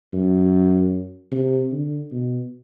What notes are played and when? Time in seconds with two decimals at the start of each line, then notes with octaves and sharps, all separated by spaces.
0.13 F#2
1.32 C3
1.72 D3
2.12 B2